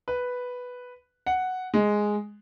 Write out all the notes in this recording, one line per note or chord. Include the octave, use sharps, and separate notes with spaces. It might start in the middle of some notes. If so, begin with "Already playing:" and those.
B4
F#5
G#3